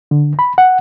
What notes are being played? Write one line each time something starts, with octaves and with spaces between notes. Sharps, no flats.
D3
B5
F#5